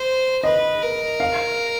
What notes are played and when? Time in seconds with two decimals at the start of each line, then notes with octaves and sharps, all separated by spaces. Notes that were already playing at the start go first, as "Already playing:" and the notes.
Already playing: C5
0.44 B4 D#5
0.82 A#4
1.20 F5